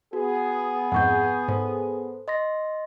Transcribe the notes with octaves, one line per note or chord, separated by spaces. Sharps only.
B3 F#4 G#4
F2 G#2 F#5 C#6 G6
G#2 A4 C5
D#5 C6 A#6